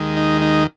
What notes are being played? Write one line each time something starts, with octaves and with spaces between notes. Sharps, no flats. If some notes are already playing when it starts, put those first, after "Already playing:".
Already playing: D#2 D#3 G#3
D#4
D#4